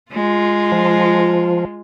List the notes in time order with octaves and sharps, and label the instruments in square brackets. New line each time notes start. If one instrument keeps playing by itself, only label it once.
[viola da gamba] G#3 F4
[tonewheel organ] F3